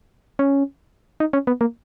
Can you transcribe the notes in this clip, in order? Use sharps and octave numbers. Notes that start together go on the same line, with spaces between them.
C#4
D#4
C#4
B3
A#3